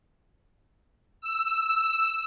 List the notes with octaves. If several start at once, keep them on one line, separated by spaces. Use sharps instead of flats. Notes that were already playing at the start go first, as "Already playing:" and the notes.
E6